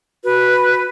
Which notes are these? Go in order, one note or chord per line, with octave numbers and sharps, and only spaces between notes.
F#4 B4